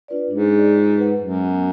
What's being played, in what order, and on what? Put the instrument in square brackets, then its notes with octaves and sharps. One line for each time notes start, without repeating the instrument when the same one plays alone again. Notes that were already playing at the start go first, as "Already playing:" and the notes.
[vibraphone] D4 F4 B4 D5
[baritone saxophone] G#2 [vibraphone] D4
[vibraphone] G#4 D5
F4
B4 F#5
[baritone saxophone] F#2 [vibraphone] G#3
[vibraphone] B3 F#4